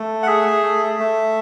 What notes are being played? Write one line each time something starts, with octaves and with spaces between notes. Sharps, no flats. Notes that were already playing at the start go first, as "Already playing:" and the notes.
Already playing: A3
F#5
G#4 E5
A3
A3